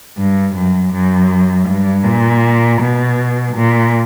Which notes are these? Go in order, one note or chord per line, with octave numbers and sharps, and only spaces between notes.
G2
F#2
F#2
G2
A#2
B2
A#2